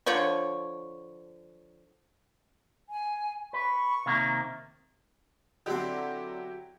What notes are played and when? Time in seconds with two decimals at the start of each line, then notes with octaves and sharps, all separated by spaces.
0.06 D3 F3 C#5 C#6
2.90 G#5
3.53 B4 C#6
4.06 C3 D#3 A#3
5.66 D3 F#3 C4 E4 G4